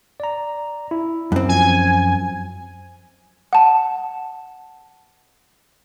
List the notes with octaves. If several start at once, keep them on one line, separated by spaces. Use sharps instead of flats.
D5 A#5
E4
F#2 C4
F3 G#5
F#5 A5